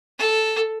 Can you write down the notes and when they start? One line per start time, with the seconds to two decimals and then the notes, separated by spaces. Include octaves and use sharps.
0.19 A4